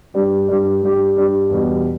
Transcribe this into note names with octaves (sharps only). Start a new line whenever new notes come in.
G2 G3 D4 G4
G2 G3 D4 G4
G2 G3 D4 G4
G2 G3 D4 G4
E2 B2 G3